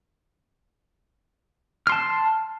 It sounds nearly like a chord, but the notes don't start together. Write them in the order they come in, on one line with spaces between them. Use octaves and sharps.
F6 C6 A5